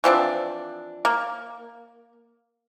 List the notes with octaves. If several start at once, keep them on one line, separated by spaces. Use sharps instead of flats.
E3 F3 C4 D4
A#3